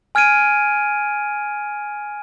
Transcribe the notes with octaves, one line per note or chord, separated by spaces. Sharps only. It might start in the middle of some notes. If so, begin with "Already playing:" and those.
G#5 F6 G#6 D7 D#7